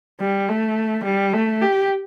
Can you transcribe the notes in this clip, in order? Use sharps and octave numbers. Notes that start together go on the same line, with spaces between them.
G3
A3
G3
A3
G4